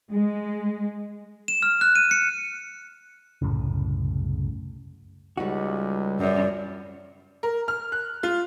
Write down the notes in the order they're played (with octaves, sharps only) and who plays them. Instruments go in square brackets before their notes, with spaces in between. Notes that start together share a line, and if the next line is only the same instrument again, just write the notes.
[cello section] G#3
[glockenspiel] E7
F6
F#6
D#7
C#7
[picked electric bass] C2 F#2 A2 C#3
[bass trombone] C#2 [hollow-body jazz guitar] G3 D#4 F#4 [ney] G4
[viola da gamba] F#2 [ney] D5
[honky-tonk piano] A#4
F6
F#6
F4